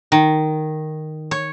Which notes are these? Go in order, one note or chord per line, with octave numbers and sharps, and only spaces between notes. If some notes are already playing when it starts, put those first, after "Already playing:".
D#3
C#5